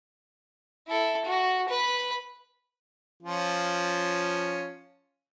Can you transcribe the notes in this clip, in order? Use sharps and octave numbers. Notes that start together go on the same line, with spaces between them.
E4 A4
F#4
B4 B5
F3 C#4 F4